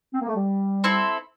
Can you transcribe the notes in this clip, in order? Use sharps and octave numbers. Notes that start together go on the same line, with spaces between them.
C4
A#3
A3
G3
C4 E4 A4